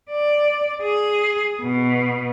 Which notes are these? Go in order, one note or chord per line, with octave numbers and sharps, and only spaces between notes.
D5
G#4
B2